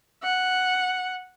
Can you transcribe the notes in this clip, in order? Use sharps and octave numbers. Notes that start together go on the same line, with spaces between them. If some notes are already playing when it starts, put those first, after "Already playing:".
F#5